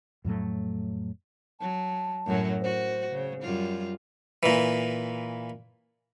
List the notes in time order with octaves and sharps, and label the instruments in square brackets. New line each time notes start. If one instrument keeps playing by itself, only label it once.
[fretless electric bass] F2 A2 F#3 A3
[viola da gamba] F#3 [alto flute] A5
[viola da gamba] F#2 A2 F#3
[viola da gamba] F#2 F#4 [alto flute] C5
[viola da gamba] C#3
F#2 G3 F4
[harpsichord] A#2 E3